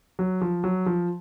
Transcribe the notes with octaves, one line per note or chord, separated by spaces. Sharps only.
F#3
F3
F#3
F3